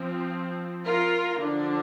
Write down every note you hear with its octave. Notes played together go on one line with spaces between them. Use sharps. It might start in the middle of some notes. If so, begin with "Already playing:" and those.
Already playing: F3 C4
F4 A#4
D3 F3 D4